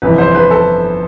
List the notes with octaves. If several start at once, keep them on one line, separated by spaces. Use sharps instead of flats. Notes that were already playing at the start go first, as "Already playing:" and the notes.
G1 F2 C3 E3 B4
C5
B4
A4